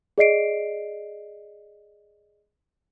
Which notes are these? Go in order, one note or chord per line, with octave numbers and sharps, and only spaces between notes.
G#4 D5 D#5 C7 D7